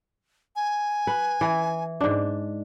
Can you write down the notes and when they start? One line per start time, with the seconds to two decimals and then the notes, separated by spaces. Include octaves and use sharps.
0.56 G#5
1.07 B4
1.41 E3
2.01 G#2 D4